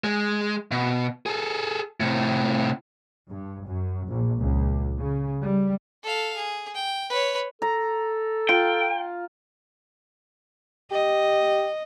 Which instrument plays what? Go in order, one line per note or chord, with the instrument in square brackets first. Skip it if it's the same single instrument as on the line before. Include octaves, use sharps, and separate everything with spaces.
[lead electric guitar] G#3
B2
G#4 A4
A2 C3
[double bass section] G2
F#2
A#1
C#2
C#3
G3
[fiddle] A4 F5
G#4
G5
B4 C#5
[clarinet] A4 [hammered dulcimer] A#5
[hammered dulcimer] F4 [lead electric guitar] G5
[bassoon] G4 [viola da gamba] D#5